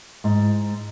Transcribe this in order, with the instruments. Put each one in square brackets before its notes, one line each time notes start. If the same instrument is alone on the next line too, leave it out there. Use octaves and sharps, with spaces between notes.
[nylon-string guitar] G#2